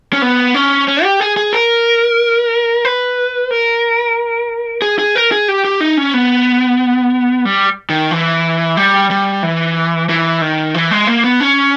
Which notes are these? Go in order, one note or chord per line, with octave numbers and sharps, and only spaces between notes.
C#4
B3
C#4
C#4
G4
G#4
G#4
A#4
B4
A#4
G#4
G#4
A#4
G#4
G4
G4
D#4
C#4
B3
G3
D#3
E3
G3
G3
E3
E3
D#3
E3
G#3
A#3
B3
C#4